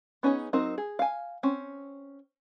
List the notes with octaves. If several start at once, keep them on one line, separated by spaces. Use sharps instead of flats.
B3 C#4 D#4 G#4 C#5
F#3 C4 D#4 A#4
G#4
F5 G#5
C4 C#4